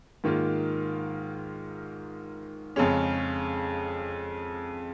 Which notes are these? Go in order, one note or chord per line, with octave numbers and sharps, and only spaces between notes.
G#2 D#3 A#3 F4
F2 C#3 G#3 C#4